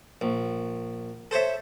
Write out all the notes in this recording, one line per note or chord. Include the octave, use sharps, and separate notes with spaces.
A#1
A4 C5 C#5 E5